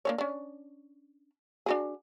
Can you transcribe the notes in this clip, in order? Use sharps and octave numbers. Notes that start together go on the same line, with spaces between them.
A#3 D4 C#5
C#4 D4
D4 F#4 G#4